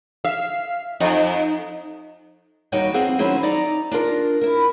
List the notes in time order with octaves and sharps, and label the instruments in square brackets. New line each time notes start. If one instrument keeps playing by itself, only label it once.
[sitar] E5 [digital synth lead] F5
[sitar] F2 [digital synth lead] D#4
[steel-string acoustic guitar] D#2 G3 D#4 F#4 C#5 G5
F2 B3 C4 G#4 F5 F#5
D#3 F#3 C#4 E4 G#4 C5
D#4 D5 A#5
D4 F4 A#4
E4 A#4